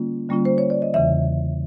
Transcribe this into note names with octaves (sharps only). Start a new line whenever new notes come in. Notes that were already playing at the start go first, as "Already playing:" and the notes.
Already playing: D3 G3 A#3 C#4 F4
D3 G3 A#3 C#4 F4
C5
C#5
D5
D#5
E2 C#3 E3 E5